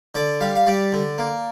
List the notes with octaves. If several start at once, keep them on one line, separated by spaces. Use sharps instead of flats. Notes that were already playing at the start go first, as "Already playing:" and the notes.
D3 D5
G3 F5
F5
G3 D5
D3
A#3